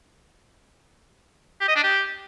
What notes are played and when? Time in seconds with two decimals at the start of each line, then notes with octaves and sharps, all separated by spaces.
1.61 G4
1.68 D#5
1.76 D4
1.84 G4